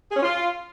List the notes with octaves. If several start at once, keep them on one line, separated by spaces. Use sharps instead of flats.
G#4
C#4
F4